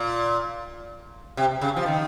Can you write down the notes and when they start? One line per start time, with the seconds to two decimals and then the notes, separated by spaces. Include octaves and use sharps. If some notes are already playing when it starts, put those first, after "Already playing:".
Already playing: A#2
1.37 C3
1.61 C#3
1.76 F3
1.86 D#3